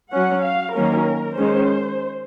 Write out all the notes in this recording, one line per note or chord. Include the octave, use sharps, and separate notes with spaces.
F#3 C#4 F#5
F5
D#3 F#3 A#3 C#4 A#4
D#3 G#3 C#4 C5